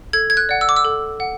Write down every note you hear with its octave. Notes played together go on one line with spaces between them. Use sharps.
A4 G#6
G#6
F#6
D5 F#5
E6
D6
E6
A4
F#5